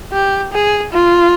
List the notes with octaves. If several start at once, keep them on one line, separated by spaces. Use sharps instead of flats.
G4
G#4
F4